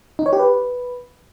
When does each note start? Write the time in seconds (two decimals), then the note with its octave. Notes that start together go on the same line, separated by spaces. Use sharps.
0.19 D#4
0.26 C#5
0.33 G4
0.40 B4